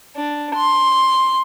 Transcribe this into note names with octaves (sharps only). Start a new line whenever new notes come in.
D4
C6